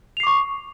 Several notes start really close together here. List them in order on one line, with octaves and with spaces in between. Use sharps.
F7 C7 D6 C#6